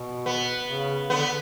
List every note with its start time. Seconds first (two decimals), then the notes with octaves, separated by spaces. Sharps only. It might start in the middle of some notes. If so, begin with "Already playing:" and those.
Already playing: B2
0.26 B3
0.68 C#3
1.09 D3 B3